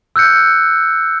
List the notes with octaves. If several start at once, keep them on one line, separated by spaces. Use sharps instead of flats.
E6 F#6 G6 C#7